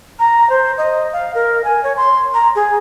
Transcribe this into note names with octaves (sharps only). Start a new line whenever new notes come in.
A#5
C5
D#5
F5
A#4
G#5
C#5
C6
A#5
G#4